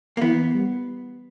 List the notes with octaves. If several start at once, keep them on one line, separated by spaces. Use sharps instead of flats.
A#3
E3 B3
G3